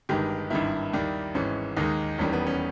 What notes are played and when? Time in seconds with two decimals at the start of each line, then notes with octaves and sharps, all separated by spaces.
0.09 G1 G2 D#3 G#3 G4
0.50 G#1 G2 D#3 E4
0.93 D#2 D#3 G3
1.35 G#1 G#2 E3 C#4
1.77 D#2 D#3 G#3 D#4
2.18 E1 E2 D#3 G3 C#4
2.33 B3
2.46 C#4